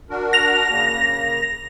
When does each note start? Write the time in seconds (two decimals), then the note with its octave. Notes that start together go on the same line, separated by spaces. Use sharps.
0.10 D4 F#4 A#4
0.33 A#6 F7
0.70 C#3 A#3